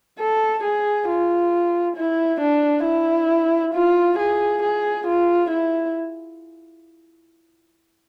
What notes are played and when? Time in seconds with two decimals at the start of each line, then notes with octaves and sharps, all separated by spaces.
0.20 A4
0.64 G#4
1.08 F4
1.97 E4
2.41 D4
2.85 E4
3.75 F4
4.19 G#4
4.63 G#4
5.07 F4
5.51 E4